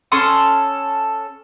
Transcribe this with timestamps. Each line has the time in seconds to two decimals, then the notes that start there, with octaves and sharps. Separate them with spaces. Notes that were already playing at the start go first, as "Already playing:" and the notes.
0.12 C#4 A4 C6 D#6